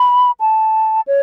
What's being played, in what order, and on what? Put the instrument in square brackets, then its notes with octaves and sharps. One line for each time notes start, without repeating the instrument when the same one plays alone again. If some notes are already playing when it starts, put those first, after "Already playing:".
Already playing: [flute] B5
A5
C#5